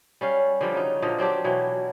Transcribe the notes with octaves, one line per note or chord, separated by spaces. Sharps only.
G3 C#4 F5
D3 F3 G3
C#3 F#3 D#4
A#2 D3 F3 D#5
F#3 C4 D4 G4
B2 E3 F#3